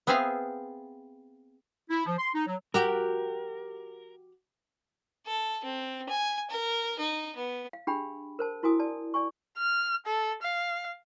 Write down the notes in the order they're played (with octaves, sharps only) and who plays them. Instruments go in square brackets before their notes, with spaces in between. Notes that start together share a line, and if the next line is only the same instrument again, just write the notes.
[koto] B3 C4 G#4 E5 F5
[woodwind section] E4
F3
C6
D#4
F#3
[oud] F#4 G4 [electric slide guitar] A#4
[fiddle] A4
C4
G#5
A#4
D#4
B3
[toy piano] F5
D4 G4 G#4 G5 B5
A#4 C5 A5
E4 F#4 A#4 G#5 D#6
D5 A5
D5 G#5 C#6
[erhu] F6
A4
F5